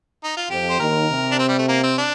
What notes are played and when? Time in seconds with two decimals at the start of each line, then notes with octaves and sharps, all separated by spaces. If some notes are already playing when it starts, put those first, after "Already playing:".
0.23 D#4
0.37 F4
0.49 F2 F3 G4
0.70 C5
0.79 D#2 D#3 A#4
1.09 C3
1.31 D4
1.39 C4
1.48 G3
1.58 A3
1.68 A#3
1.83 C4
1.98 D4